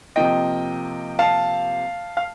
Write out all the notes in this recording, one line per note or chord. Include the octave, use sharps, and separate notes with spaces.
C3 F3 A#3 D#5 G5
F5 A5
F5